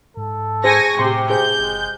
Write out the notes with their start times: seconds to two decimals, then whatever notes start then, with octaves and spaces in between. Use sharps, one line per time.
0.17 G#2 A4
0.64 G#4 C5 G#5 C#6 A#6
0.99 A2 C3 G4 C6
1.30 G#4 C5 G6
1.59 F#1 G#3